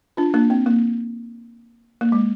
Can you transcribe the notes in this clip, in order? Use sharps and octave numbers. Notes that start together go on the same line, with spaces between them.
D4 F4
A#3 D4
C4
A#3
A#3
G#3